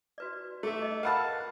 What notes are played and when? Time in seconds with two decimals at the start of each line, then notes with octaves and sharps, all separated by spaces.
0.18 F#4 B4 D5
0.63 A3 G#4 E5
0.82 D#5
1.03 A#4 B4 F5 F#5 A5 B5